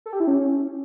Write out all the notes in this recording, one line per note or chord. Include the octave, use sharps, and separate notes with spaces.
A4
G4
E4
C#4